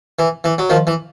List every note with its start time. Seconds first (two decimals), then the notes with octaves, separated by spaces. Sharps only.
0.19 E3
0.44 E3
0.58 F#3
0.70 D#3 F3
0.87 E3